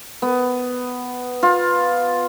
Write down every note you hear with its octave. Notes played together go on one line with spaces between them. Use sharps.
B3
F4